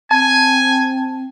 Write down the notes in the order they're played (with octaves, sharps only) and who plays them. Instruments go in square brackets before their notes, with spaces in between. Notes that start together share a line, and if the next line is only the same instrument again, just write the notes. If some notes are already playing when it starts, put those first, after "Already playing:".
[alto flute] C4 [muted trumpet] G#5 [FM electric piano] A5